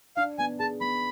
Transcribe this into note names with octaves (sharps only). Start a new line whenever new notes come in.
D4 F5
B3 G#5
G#4 A5
B3 B5